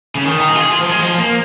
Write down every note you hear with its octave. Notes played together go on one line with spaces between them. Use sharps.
C#3
D#3
D#4
G#4
F4
G#4
F4
F3
G#3
F3
A#3